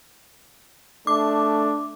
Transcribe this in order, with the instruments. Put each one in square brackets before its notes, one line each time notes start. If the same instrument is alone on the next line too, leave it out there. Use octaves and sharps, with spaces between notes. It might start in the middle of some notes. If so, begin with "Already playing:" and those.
[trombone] A3 [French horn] D4 [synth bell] D6